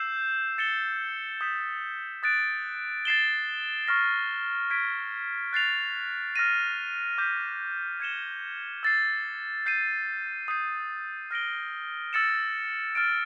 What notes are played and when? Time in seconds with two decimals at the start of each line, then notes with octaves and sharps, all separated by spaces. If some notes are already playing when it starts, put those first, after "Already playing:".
Already playing: E6 G6 C7 E7
0.58 A6 C#7 E7 G7
1.41 D#6 G6 B6 E7
2.23 D#6 F#6 A6 D7
3.05 A6 C7 E7 G7
3.88 C#6 F6 A#6
4.70 G#6 B6 D7
5.53 F#6 A6 C7 F7
6.36 F6 A#6 D#7
7.18 D6 G6 B6
8.00 G#6 C#7 E7 G7
8.83 E6 A6 C7
9.66 G6 C7 D#7
10.48 D#6 G6 C7
11.31 F6 A#6 D7 G7
12.13 E6 A6 C#7 E7
12.95 F6 A6 D7